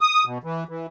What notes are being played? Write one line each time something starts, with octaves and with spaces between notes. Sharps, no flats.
D#6
B2
E3
E3